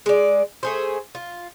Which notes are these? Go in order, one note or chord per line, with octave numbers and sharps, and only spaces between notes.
G#3 D5
A3 G#4 C5
F4